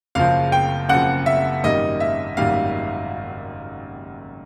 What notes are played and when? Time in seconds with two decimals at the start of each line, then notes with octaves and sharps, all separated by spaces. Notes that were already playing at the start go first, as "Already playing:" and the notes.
0.15 F#1 F#2 C#3 F3 F5
0.52 G5
0.89 F#1 F#2 C#3 F3 F#5
1.26 E5
1.63 G#1 F#2 D#3 G3 A#3 D#5
2.00 E5
2.37 G#1 F#2 D#3 G3 A#3 F5